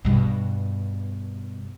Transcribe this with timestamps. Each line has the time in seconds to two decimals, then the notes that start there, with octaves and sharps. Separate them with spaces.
0.05 G2 B2